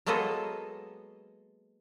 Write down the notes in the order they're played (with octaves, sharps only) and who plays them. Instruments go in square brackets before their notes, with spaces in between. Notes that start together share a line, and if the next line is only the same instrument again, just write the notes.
[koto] F#3 G#3 A#3 B3 A4 D#5